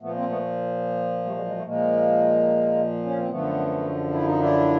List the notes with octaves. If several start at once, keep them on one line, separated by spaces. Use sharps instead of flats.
A#2 F3 A3 B3
A#3 C4
A3 B3
G3 A3
F#3 G#3
F#3 G#3
G3 A3
A#2 F3 G#3 A#3
C#4
C4
F#2 D3 F3 A3 B3
E4
D#4
D4 E4